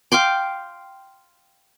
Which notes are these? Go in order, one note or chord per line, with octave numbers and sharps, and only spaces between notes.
F5 G5 C6 D6